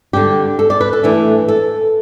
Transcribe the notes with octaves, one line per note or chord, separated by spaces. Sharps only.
D3 G3 D4 G4
A4
D5
B4
A4
A2 E3 A3 D4
A4